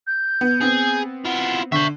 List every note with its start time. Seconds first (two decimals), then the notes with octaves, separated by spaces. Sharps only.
0.07 G6
0.41 B3
0.61 B3 C4 G#4
1.25 E4 F4 F#5
1.72 D3 E5 G5 C#6